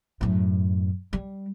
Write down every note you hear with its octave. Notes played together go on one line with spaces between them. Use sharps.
F#2 A2
G3